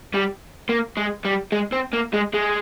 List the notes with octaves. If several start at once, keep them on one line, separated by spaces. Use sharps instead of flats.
G3
A#3
G#3
G3
G#3
C4
A#3
G#3
G#3